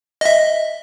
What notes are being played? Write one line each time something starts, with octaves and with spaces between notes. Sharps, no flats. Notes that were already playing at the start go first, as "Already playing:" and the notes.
D#5 E5